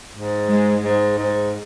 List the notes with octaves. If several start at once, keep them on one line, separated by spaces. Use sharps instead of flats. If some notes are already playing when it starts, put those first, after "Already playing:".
G#2
G#3
G#2
G#2